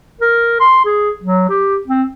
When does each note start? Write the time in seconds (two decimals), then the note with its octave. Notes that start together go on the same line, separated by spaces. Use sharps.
0.21 A#4
0.60 C6
0.85 G#4
1.23 F#3
1.49 G4
1.87 C4